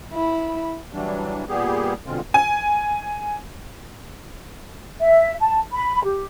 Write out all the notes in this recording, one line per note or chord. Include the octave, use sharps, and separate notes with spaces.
E4 B5
E3 F#3 G3 D4
A#2 G3 B3 G4 G#4
B2 D3 G#3 C4 F4
G#5
E5
A5
B5
G4